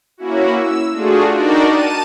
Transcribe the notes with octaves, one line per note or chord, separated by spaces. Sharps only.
A#3 C#4 E4 F#4
E6
A3 D4 F4 F#4 G#4
D4 D#4 F#4 A#4 D5 G5
A5 D#7